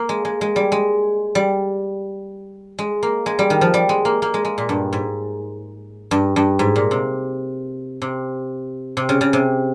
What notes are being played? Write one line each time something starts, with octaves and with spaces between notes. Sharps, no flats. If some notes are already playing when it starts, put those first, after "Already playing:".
Already playing: A#3
G#3
G#3
G#3
G3
G#3
G3
G#3
A#3
G#3
G3
D#3
F3
G3
G#3
A#3
A#3
G#3
G#3
A#2
G2
G#2
G2
G2
G#2
A#2
C3
C3
C3
C#3
C#3
C3